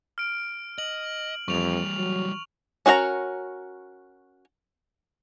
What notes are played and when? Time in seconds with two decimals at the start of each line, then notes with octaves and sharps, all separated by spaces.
0.18 F6 D7
0.78 D#5 F#7
1.48 F2 E3 G3 C#6 F7
1.98 F#3
2.86 C#4 F#4 A#4 F5 A#5